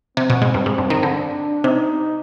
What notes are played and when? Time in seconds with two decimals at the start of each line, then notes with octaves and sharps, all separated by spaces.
0.17 C3 C4
0.30 B2
0.42 G#2
0.54 G2
0.66 G#2
0.78 G2
0.90 D#3
1.03 D3
1.15 D4
1.64 C3 D#4